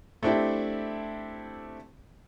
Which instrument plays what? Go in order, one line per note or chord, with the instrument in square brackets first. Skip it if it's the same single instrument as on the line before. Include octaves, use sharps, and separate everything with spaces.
[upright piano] A3 C4 D4 E4 G4